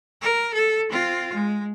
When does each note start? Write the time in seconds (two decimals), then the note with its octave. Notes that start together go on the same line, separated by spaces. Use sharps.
0.22 A#4
0.54 A4
0.90 C4 F4
1.34 G#3